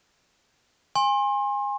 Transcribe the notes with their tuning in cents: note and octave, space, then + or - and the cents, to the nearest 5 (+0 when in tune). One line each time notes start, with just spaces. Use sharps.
G#5 -25 C6 +35